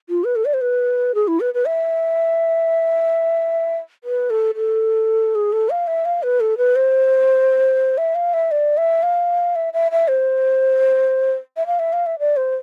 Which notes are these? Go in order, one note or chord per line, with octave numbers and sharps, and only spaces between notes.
F4
B4
A4
D5
C5
B4
G#4
E4
B4
B4
E5
B4
A4
A4
G#4
A4
F5
E5
F5
B4
A4
B4
C5
E5
F5
E5
D5
E5
F5
E5
E5
E5
C5
E5
F5
E5
F5
E5
D5
C5